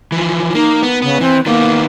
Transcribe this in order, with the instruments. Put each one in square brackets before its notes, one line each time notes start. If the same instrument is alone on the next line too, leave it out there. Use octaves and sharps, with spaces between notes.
[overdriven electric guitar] E3 F3
[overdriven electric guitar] A#3 [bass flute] D#4
[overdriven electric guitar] B3
[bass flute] C#3 [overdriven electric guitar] B3
[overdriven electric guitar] E3 [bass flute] C4
[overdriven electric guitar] D#3 B3 [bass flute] A#3